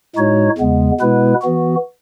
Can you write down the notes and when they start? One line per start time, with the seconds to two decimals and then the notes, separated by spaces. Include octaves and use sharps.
0.16 A2 G#3 D#4 F#4 C#5
0.58 E2 C#3 G#3 B3
1.00 B2 G#3 B3 E4 B4
1.42 E3 B3 F#4